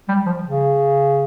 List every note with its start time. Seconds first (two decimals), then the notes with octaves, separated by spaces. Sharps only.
0.08 G3
0.25 F3
0.43 C#3